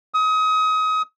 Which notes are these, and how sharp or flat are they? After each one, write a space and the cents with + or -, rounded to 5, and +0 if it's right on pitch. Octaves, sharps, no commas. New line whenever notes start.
D#6 +30